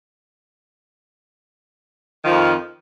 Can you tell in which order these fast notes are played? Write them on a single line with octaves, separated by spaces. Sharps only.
D#3 F3 F2